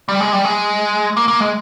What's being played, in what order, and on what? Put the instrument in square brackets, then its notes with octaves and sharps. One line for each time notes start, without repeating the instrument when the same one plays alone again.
[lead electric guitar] G3
G#3
G3
G#3
A#3
A#3
G#3